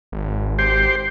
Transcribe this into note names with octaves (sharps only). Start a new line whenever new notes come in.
G#1
G4 C5